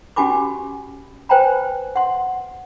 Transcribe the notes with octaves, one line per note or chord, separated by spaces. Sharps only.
C#4 F#4 G4 G#5 B5 D6
B4 C5 G5 G#5 A#5 B5
F#5 C6